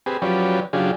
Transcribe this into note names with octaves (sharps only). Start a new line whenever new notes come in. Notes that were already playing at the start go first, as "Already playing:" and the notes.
C4 G4 G#4 B4
F3 F#3 C#4 G4 B4 D5
C#3 F#3 D4 F4 G4 G#4